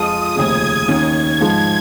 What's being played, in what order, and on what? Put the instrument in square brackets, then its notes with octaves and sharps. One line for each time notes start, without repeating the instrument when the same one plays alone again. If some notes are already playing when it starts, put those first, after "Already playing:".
Already playing: [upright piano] F2 F3 G#3 F4 [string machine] D#6
[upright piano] F1 D#2 C#3 [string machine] G#6
[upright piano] D#2 D#3 C#4
[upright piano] G#2 F3 G#3 [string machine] G#6